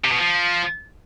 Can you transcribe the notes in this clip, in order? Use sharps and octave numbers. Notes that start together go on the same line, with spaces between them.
C3
B2
F3